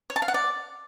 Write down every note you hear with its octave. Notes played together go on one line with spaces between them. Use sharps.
C#5
A5
F5
F#5
D5